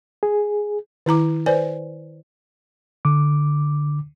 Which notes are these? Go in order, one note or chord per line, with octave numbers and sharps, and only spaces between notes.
G#4
D#3 E4 A#5 D6
B4 C5 D5 G#5
D3 D6